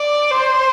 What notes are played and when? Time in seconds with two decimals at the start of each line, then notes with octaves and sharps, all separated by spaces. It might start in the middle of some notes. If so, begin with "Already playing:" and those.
Already playing: D5
0.30 C5